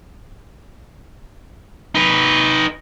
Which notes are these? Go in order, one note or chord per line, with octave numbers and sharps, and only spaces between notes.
D#4 B4